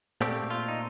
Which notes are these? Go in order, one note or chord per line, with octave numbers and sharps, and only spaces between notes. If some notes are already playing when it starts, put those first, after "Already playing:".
A#2 A3 C4 G4
F4
D#4